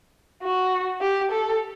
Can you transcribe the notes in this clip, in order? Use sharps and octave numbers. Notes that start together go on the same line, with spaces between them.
F#4
G4
A4